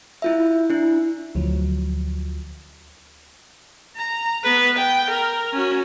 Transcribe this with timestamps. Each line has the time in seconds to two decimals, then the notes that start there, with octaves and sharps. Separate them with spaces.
0.22 E4 F4 E5
0.70 D4 E4
1.35 D2 F3 F#3
3.97 A#5
4.44 B3 B4
4.78 G5
5.10 A#4
5.53 C#4 F#4